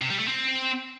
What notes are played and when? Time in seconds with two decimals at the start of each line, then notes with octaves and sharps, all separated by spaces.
0.01 C3
0.10 G3
0.19 A3
0.28 C4